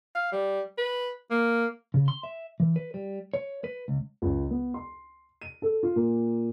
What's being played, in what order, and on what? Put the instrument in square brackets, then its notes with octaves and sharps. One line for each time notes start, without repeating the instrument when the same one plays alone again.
[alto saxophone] F5
G3
B4
A#3
[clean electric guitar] C#3
C6
E5
E3
B4
G3
C#5
B4
C#2
[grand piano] C#2
B3
C6
D#7
A4
F4
A#2